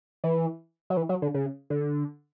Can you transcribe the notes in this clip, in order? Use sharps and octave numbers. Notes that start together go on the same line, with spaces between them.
E3
F#3
E3
F#3
D3
C#3
D3